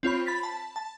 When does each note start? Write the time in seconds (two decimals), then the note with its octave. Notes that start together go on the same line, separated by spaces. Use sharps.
0.03 C4 F4 C#5 B5
0.26 B5 A6 B6
0.43 A5
0.76 A5